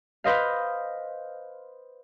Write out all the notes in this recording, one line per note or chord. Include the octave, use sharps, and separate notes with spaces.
B4 C5 D#5 F5